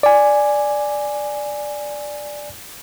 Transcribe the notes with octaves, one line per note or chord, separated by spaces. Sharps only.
D5 G#5